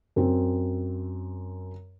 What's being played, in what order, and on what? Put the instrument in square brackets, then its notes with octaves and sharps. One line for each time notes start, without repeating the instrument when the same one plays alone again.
[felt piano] F#2 C4